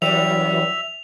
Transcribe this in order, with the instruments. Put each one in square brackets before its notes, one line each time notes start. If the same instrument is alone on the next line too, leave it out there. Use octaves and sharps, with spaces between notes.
[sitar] F#2 G3 [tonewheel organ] E3 F#3 [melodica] E5 [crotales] F7